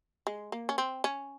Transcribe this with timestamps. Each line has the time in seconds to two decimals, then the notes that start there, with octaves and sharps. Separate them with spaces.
0.27 G#3
0.52 A#3
0.69 C#4
0.78 C4
1.04 C#4